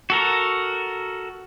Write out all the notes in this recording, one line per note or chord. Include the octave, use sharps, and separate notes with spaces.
F#4 A4 A#4